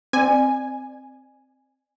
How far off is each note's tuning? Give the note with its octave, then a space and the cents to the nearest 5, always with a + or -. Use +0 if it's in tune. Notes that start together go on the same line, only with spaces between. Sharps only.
C4 +0 D5 +35 G#5 +0